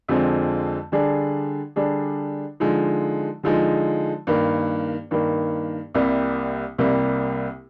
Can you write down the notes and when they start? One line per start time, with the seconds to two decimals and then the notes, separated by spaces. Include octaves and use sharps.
0.08 F2 D3 F3 G#3 C4
0.92 D3 G3 D4 G#4
1.76 D3 G3 D4 G#4
2.60 D3 F3 G#3 D#4
3.43 D3 F3 G#3 D#4
4.27 G2 D#3 A#3
5.11 G2 D#3 A#3
5.94 C2 C3 G3 A#3
6.78 C2 C3 G3 A#3